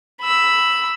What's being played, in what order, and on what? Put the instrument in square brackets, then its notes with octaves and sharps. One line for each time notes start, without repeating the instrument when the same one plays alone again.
[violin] B5 E6